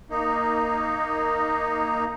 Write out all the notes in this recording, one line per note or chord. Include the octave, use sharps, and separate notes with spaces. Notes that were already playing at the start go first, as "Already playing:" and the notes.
A#3 D#4